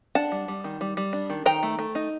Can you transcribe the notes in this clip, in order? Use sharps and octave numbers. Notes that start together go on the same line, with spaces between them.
D4 F#5 A5
G3
G3
D#3
G3
G3
D4
D#3
D#3 G5 A#5
A3
A3
D#4